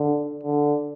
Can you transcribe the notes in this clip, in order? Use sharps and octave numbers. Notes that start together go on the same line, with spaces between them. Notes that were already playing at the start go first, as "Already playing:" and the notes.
Already playing: D3
D3